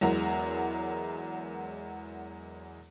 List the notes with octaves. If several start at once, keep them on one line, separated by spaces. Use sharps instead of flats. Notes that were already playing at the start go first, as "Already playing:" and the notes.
E2 F#3 G#3 E4 A#4 A#5